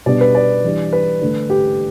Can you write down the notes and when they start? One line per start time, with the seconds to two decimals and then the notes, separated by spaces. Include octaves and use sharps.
0.06 B2 G3 B3 D4 D5
0.21 B4
0.35 D5
0.64 E3 G3 D4
0.93 B4
1.21 D3 A3 D4
1.50 G4